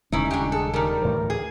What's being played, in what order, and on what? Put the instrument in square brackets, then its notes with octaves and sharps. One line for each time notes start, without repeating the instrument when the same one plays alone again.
[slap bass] D#1 C#3 G#3 [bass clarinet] C#4 [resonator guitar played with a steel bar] D#4 E4
[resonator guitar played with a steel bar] D4 G4
[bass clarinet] G#4 [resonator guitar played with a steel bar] A4
[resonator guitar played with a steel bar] D#3 G3 [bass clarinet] A#4
[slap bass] D2 A2 E3
[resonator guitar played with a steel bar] G#4